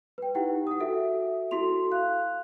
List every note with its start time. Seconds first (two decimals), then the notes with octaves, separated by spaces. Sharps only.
0.18 B4 G5
0.35 D#4 E4 G4 F#5 G5
0.67 F#5 D#6
0.80 F#4 A4 E5
1.51 E4 F#4 A4 C6 F7
1.91 F5 F#6